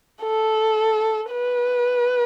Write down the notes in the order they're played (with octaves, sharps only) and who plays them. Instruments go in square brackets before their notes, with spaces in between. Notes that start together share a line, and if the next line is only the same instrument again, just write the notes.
[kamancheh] A4
B4